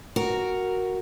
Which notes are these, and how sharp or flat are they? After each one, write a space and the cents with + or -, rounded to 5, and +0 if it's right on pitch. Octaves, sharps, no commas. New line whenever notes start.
F#4 +0 A#4 +0